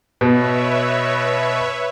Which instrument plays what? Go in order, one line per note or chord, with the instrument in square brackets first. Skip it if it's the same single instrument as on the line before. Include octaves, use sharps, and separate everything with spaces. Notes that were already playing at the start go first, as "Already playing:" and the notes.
[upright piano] B2 [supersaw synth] B4 C#5 E5